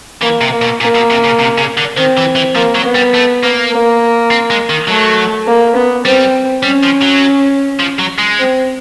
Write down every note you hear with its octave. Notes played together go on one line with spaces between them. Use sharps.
E3 A#3
C3
A#3
B2
A#2 A#3
B2
C3
C#3
C3
C#3
D3
D#3 C4
E3
E3
F3 A#3
F#3
B3
G3
A3
A#3
A#3
C4
G#3
D#3
F#3 A3
A#3
B3
G3 C4
G3 C#4
F3
F#3
F3
F#3
G#3
C4